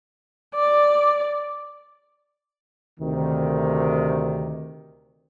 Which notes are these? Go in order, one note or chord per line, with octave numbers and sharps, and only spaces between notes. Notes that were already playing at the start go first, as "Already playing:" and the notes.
D5
D2 C3 D#3